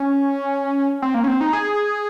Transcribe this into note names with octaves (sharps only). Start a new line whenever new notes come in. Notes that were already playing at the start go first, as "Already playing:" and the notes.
Already playing: C#4
C4
A#3
C#4
C4
D#4
G#4